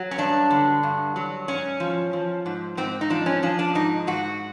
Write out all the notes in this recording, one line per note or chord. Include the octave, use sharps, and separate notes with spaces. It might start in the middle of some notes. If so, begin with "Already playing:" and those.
Already playing: F#3
C#4
G2 D4
D3
G2
F#3
G#2 C#4
F3
F3
G#2
G#2 C4
D#4
F3 D4
C#4
F3 D4
D4
G#2 D#4
G#2 F#4